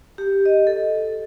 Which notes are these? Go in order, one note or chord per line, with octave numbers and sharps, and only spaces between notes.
G4
D#5
A4